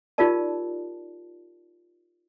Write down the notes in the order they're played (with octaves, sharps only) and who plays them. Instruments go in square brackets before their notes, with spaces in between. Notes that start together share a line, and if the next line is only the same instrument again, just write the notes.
[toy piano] D#4 F4 G4 A#4 D5 A5